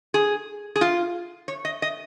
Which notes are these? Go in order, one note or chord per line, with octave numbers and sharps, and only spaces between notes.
G#4
G#4
F4
C#5
D#5
D#5